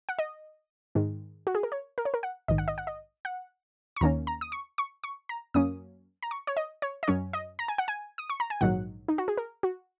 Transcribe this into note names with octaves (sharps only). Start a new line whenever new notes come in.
F#5
D#5
G#2 D#3 G#3
F#4
G#4
A#4
C#5
A#4
C#5
A#4
F#5
A#1 G#2 D#3 D#5
F#5
D#5
F#5
D#5
F#5
C#6
D#2 D#3 A#3 C#4 A#5
A#5
D#6
C#6
C#6
C#6
A#5
F#2 F#3 A#3 C#4 D#6
A#5
C#6
C#5
D#5
C#5
D#5
F#2 F#3 C#4 C#5
D#5
A#5
G#5
F#5
G#5
D#6
C#6
A#5
G#5
A#1 G#2 D#3 F#3 F#5
D#4
F#4
G#4
A#4
F#4